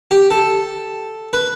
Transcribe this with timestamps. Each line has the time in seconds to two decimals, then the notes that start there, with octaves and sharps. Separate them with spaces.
0.11 G4
0.31 A4
1.33 B4